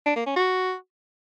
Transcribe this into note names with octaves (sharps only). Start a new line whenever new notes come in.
D4
A#3
C#4
F#4